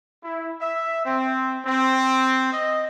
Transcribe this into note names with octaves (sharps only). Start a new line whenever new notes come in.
E4
E5
C4
C4
D#5